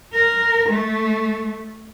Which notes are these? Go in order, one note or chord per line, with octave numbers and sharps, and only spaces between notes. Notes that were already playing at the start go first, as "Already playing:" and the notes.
A#4
A3